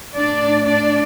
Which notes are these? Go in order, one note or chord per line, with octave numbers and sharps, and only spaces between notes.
A2 A3 D4 D5
D4 D5